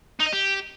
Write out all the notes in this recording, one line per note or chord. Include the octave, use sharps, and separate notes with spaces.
D#4
D#5
G4